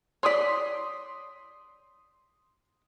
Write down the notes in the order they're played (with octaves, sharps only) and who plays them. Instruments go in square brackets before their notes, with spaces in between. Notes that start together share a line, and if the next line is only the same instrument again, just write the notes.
[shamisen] C#5 D5 [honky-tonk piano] C6 D#6 B6